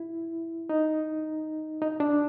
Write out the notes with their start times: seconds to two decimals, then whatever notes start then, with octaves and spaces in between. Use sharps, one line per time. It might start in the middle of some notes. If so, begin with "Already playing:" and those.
Already playing: E4
0.69 D#4
1.82 D#4
2.00 D4